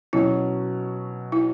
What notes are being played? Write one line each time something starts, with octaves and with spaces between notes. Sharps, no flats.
B2 F#3 C#4 E4
E4